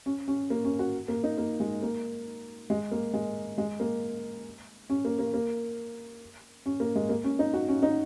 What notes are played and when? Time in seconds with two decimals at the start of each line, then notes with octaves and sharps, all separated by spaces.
0.06 C#4
0.28 C#4
0.50 A#3
0.65 C#4
0.79 F#4
1.08 A#3
1.24 D#4
1.38 A#3
1.60 G#3
1.82 A#3
2.70 G#3
2.91 A#3
3.13 G#3
3.58 G#3
3.80 A#3
4.90 C#4
5.05 A#3
5.19 A#3
5.34 A#3
6.66 C#4
6.80 A#3
6.95 G#3
7.09 A#3
7.24 C#4
7.39 D#4
7.54 F#4
7.68 C#4
7.83 D#4